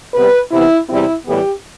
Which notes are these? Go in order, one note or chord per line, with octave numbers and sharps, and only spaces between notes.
C3 G3 B3 B4
C3 E3 B3 E4
E2 C3 G3 C4 E4
A2 E3 G3 B3 G4